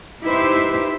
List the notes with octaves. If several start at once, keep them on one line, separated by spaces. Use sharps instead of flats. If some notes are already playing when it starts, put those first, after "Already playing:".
D#4 E4 G4 B4 C5 E5